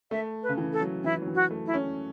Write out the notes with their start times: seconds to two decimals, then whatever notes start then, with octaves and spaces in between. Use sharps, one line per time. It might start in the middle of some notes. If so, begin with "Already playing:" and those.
0.11 A3 E5
0.43 B4
0.49 C#3
0.58 E3
0.73 A4
0.81 F#3
1.04 E3 E4
1.22 F#3
1.27 E3
1.35 F#4
1.51 A3
1.66 E4
1.74 C#4